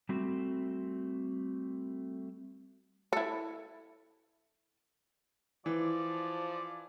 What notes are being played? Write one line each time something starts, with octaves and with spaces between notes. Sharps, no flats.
G3 A3 C4 F#4
E4 A4
E3 F3 D5